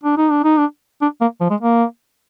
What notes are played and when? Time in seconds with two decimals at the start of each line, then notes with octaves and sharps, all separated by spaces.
0.04 D4
0.18 D#4
0.31 D4
0.44 D#4
0.58 D4
1.02 D4
1.21 A#3
1.41 F3
1.50 G#3
1.60 A#3